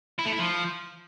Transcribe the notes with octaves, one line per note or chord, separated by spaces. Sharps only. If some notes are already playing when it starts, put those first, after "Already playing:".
E4
A3
E4
F3